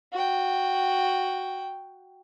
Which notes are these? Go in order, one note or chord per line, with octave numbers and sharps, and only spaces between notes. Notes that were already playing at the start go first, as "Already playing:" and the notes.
F#4 G5